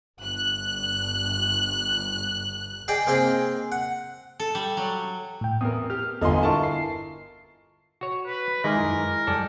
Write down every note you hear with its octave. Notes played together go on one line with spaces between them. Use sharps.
G1 F#6
G#4 D5 D#5 G5
A#3 C4 G#4 D#5 G5
F#5
A4
G3
F#3
A2 G5
E2 A#4 D#6
G4 F6
G1 E2 F4 A4 D#5 G#5 C6
E4 F4 A#4 A5 C#6
C7
F#4 C#5
B4
D#3 G#3 A#4 E5 A#5 D6
F#2 E4
F#2 G3 A4 D5 G#5